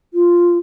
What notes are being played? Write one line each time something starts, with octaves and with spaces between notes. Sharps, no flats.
F4